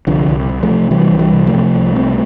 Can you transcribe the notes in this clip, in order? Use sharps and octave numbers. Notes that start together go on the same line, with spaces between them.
C2 D3 F3
C2
C3
F3 A3
C3
C3 E3 G3
C2
E3 G3
C3
F3 A3
C3
C2
C3